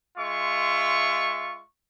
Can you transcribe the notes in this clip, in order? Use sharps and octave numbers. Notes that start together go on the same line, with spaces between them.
G#3 F4 E5 C#6